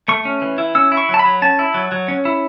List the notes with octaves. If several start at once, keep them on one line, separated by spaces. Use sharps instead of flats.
A3 C#6
C#4
E3
E4
C#4 E6
E4
C#6
F#3 A5
B5
F#3
C#4 A5
E4
F#3
F#3
C#4
E4